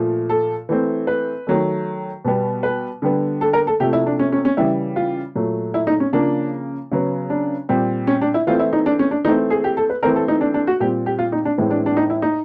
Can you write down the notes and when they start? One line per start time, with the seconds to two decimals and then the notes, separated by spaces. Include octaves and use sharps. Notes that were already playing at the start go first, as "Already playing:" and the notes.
Already playing: A#2 F3 A3
0.29 A4
0.69 E3 A3 C4
1.07 B4
1.47 D#3 F#3 A3
2.25 B2 G3 B3
2.63 B4
3.02 D3 G3 B3
3.41 A4
3.53 A#4
3.67 A4
3.80 C3 F3 A3 G4
3.93 E4
4.06 D4
4.19 C#4
4.32 C#4
4.45 C#4
4.57 C#3 E3 G3 E4
4.96 F4
5.35 A#2 F#3 A3
5.74 E4
5.87 D#4
6.00 C#4
6.13 C#3 F3 A#3 D4
6.92 C#3 F#3 B3
7.30 D4
7.69 A#2 G3 C4
8.07 C#4
8.21 D4
8.34 E4
8.47 E3 A3 C4 F4
8.59 E4
8.73 D#4
8.86 D4
8.99 C#4
9.11 D4
9.24 E3 D#4
9.27 A3 C4
9.50 G#4
9.64 G4
9.77 A4
9.90 B4
10.03 E3 A3 C4 A#4
10.16 A4
10.28 D#4
10.41 D4
10.54 D4
10.67 F#4
10.80 A#2 G3 C4 G4
11.06 G4
11.19 F4
11.32 D#4
11.45 D4
11.58 A2 E3 G#3 C4
11.71 D4
11.86 D4
11.97 D#4
12.10 E4
12.22 D#4